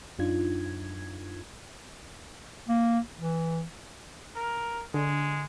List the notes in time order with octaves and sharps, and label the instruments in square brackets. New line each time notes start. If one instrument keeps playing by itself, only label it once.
[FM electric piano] F#2 D4 D#4 F4 G#6
[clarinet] A#3
E3
[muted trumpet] A#4
[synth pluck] D3 [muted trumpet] G#3